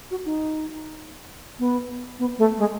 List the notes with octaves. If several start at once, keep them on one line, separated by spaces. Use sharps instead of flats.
F#4
D#4
B3
B3
A3
G#3